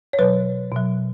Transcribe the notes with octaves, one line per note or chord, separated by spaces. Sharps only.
C#5
B2 F#3 B4
B2 F#3